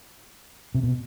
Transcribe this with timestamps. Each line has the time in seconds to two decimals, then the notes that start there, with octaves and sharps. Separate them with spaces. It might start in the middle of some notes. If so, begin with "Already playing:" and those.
0.75 C3
0.83 B2